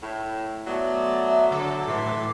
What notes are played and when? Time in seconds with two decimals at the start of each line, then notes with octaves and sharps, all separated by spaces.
0.02 A2
0.67 F#3 A3 B3 D5
1.27 E5
1.51 D3 A4 D6
1.87 A2 E3 A4 E5 C6